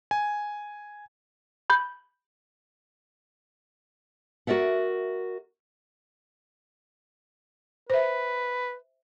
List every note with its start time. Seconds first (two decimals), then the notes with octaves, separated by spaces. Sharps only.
0.11 G#5
1.70 B5 G6
4.47 F#4 A#4 D5 E5 F#5
7.90 B4 C5 E5